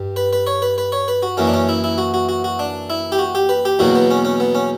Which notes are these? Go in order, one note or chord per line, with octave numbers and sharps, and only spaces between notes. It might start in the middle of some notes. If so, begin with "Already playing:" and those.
Already playing: G2 G3
B4
B4
C#5
B4
B4
C#5
B4
F#4
F#2 E3 A#3 C#4
D4
C#4
E4
E4
F#4
F#4
F#4
F#4
D4
E4
G4
F#4
G4
B4
G4
E2 B2 F#3 A#3 F#4
B3
C#4
C#4
B3
C#4